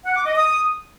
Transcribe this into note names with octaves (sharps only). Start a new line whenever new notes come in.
F#5
D6
D#5
D#6